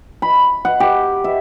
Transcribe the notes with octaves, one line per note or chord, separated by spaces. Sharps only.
B5
F#5
G4
E5